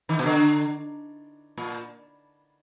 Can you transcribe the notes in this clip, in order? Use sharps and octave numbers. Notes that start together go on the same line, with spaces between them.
D#3
B2
D3
A#2